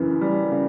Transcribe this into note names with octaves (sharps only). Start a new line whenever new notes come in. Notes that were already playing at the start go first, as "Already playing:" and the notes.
Already playing: F#2 C#3 E3
G3
C#3